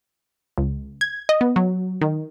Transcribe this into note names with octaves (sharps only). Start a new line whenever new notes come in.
C#2
G#6
D#5
B3
F#3
D#3